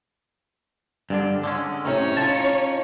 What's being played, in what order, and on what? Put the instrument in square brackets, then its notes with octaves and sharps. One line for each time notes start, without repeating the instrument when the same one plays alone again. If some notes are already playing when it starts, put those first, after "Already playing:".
[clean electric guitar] G2 D3 D4
D3 G#3 C#4
[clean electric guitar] A2 C3 D#3 [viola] C#4 C#5
[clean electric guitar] D#4 F4 A5